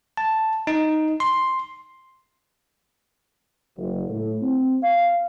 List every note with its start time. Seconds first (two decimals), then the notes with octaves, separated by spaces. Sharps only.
0.17 A5
0.67 D#4
1.20 C6
3.76 F#1
4.09 A2
4.42 C4
4.82 F5